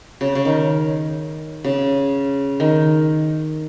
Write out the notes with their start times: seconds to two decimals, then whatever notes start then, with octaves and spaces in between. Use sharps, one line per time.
0.21 C#3
0.35 C#3
0.45 D#3
1.64 C#3
2.60 D#3